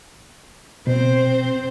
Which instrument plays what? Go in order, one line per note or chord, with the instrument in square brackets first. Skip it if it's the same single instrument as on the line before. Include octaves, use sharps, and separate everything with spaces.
[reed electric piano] B2 [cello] C4 C5